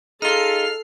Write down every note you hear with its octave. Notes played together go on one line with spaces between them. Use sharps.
D#4 F4 G#4 A4 F6 C7